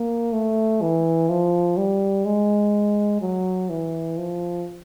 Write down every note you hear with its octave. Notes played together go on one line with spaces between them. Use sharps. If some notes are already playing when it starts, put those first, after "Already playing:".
Already playing: A#3
A3
E3
F3
G3
G#3
F#3
E3
F3